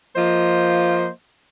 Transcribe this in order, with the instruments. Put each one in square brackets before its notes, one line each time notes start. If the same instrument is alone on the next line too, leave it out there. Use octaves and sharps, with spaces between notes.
[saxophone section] F3 A#3 F4 C5 D#5